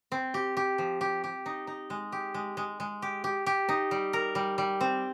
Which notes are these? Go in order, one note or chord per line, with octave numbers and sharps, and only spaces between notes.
C4
G4
G4
F3
G4
G4
D#4
D#4
G#3
G4
G#3
G#3
G#3
G4
G4
G4
D#4
G3
A#4
G3
G3
C4